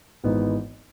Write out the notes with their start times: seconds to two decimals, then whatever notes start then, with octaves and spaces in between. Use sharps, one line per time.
0.24 G#1 G#2 E3 B3 D#4